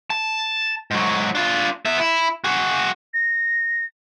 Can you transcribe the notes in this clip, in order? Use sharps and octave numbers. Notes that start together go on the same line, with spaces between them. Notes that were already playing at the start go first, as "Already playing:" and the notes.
A5
G#2 F#3
D4 F4
B3 E5
E4
F#4 G#4
A#6